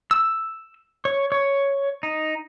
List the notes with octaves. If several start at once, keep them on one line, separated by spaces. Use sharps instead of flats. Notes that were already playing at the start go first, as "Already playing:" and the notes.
E6
C#5
C#5
D#4